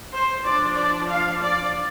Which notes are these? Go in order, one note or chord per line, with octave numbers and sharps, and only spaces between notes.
C5
F3 D4 D5
D5
F5
D5